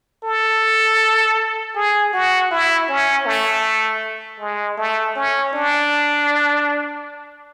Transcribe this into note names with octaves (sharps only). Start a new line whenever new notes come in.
A4
G#4
F#4
E4
C#4
A3
G#3
A3
C#4
D4